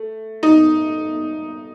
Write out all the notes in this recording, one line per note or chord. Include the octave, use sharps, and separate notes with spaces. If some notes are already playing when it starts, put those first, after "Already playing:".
Already playing: A3
D#4